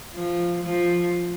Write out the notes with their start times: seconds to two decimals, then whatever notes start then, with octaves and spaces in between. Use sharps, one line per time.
0.14 F3
0.63 F3